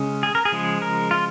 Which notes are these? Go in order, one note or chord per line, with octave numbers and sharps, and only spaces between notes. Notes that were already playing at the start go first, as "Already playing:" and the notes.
Already playing: C#3 G#3 C#4
G#4
A#4
G#4
C#3 F3 G#3
A#4
F4